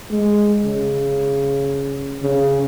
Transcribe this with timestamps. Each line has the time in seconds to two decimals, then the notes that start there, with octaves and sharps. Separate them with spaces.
0.10 G#3
0.64 C#3
2.23 C#3